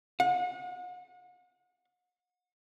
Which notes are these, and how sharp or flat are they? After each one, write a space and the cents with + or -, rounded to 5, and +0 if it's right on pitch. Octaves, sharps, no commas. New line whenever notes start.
F#5 -40